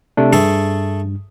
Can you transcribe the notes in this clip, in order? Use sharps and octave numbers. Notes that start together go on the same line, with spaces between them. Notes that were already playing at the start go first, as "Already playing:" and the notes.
C3 A3 D4
G2 A3 G#4 A4